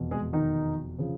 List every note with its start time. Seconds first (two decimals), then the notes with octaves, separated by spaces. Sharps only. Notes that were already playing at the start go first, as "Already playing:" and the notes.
Already playing: F1 E2 B2
0.11 G#3 G#4
0.33 D#3 D#4
0.98 C#3 F3